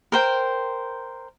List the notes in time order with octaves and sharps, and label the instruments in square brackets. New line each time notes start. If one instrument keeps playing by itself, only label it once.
[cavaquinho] A#4 C5 G5